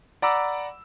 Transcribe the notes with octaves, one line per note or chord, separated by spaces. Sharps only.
D5 F#5 A#5 B5 D6 E6